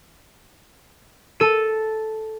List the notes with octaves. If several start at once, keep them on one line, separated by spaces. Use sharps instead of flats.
A4 D#7